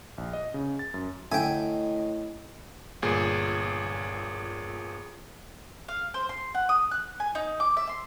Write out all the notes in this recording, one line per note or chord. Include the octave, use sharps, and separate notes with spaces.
A#1
D#5
C#3
A6
F#2
A2 D3 D#5 E5 G5 G#5
G1 A#2 G#4
F5
C5
C6
F#5
D#6
F#6
G#5
D#4
D6
E5
C6